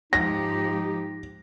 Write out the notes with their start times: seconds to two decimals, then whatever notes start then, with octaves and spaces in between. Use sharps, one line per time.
0.13 G#2 F3 D#4 G4 A#6